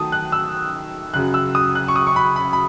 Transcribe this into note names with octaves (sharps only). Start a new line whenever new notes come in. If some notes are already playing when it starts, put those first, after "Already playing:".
Already playing: D#3 F#3 A3 A5 D#6
F#6
E6
F#2 C#3 F#3 F#6
E6
D#6
F#6
C#6
D#6
C#6
B5
B5
B5